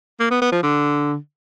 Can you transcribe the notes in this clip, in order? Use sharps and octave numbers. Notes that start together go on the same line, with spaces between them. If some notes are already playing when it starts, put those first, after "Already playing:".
A#3
B3
B3
F3
D3